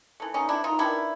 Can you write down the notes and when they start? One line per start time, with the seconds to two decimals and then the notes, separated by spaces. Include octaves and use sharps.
0.20 E3 A3
0.34 C#4 D#4
0.49 D4 E4
0.64 D#4 F4
0.79 D#3 G#3 B3 D4 E4